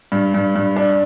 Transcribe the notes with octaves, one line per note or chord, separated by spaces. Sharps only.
G2
G2
G2
D4